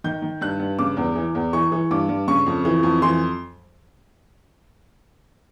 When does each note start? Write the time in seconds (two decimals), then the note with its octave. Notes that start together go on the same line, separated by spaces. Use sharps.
0.04 D#3 G6
0.22 D#3
0.41 G2 F#6
0.59 G2
0.79 C#3 D6
0.97 E2
1.16 E3
1.35 E2
1.53 E3 C#6
1.72 E3
1.91 G2 D6
2.09 G2
2.28 C#3 C#6
2.46 F2
2.65 E3
2.83 F2
3.02 E3 C6